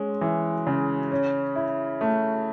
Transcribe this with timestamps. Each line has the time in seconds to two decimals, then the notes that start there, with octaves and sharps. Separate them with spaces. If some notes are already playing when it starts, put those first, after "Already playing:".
Already playing: G#3 C#4
0.21 E3
0.67 C#3
1.12 C#4
1.56 E4
2.01 A3